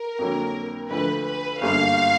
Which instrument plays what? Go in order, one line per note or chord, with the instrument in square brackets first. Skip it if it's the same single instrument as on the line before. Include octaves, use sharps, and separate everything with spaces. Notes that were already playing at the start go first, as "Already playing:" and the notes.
Already playing: [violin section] A#4
[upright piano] F2 D3 F#3 A#3
[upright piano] D2 D3 F3 [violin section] B4
[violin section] B4
[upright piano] G1 F#2 D3 G3 A#3 [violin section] F5